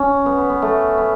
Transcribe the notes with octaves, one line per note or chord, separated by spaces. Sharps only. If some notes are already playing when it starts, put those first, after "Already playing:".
Already playing: C#4
B3
B3
B3
A3
B3